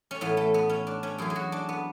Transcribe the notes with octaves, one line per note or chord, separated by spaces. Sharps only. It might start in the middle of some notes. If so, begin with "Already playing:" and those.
C#4
A2 E3 B3
A3
B3
C#4
D4
C#4
F#2 E3 G#4
G#4
F#4
D4
B3